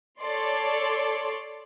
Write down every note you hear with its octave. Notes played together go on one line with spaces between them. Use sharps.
A4 C#5 D5 C6